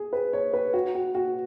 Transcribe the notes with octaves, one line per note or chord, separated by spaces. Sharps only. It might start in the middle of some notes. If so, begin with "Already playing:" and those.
Already playing: G#4
B4
C#5
B4
F#4
F#4
F#4